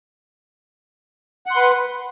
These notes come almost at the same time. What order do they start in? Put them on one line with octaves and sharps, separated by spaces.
F#5 C6 B4